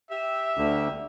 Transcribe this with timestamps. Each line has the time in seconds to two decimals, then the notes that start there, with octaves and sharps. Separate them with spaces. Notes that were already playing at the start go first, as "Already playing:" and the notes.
0.11 G4 E5
0.58 D2 D3